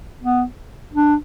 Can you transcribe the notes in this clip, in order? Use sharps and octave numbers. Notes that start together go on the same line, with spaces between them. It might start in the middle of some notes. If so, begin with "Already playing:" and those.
B3
D4